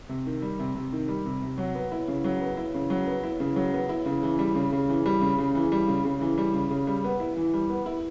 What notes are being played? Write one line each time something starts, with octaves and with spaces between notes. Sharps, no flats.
C3
D#3
G3
C3
C3
D#3
G3
C3
C3
F#3
B3
E4
C#3
F#3
B3
E4
C#3
F#3
B3
E4
C#3
F#3
B3
E4
C#3
E3
G3
C#3
C#3
E3
G3
C#3
C#3
E3
G3
C#3
C#3
E3
G3
C#3
C#3
G3
B3
E4
E3
G3
B3
E4